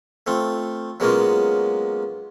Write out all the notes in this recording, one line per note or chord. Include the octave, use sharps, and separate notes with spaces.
A3 C4 F4
F#3 G#3 A#3 B3 C#4 F4